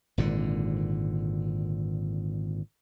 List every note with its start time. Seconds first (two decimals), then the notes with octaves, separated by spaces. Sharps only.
0.18 G#1 A#2 D3